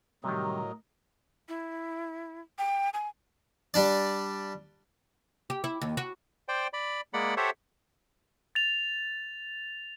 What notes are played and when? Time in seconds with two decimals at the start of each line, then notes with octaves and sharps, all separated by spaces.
0.24 A2 C3 D#3 F#3 G3 A#4 D#5
1.49 E4
2.58 G5
2.94 G#5
3.74 G3 D4 D5
5.50 G4
5.64 E4
5.81 D#2
5.97 F#4
6.48 C5 D5 G5
6.73 D5 B5
7.14 G#3 A#3 D5 F#5 B5
7.37 G4 A4 C5 C#5 E5 F#5
8.55 A6 F7